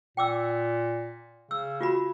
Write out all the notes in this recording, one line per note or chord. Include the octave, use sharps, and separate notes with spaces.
A#2 G5 D6 E6
C#3 E6
F4 F#4 B5